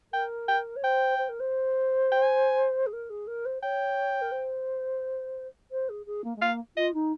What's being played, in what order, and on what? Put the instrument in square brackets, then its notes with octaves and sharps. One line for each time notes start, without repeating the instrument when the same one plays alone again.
[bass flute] A#4 [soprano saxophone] G5
[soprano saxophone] G5
[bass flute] C#5
[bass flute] C5 [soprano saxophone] G5
[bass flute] C5
A#4
C5
[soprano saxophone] G5
G#5
[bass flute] G#4
A#4
G#4
A#4
C5
[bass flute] C#5 [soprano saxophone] G5
[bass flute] A#4
C5
C5
G#4
G#4
A#3
G#3
[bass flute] A#3 [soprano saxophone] F5
[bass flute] F4 [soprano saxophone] D#5
[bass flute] D#4